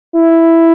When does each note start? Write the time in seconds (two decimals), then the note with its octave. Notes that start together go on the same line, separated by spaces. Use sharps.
0.15 E4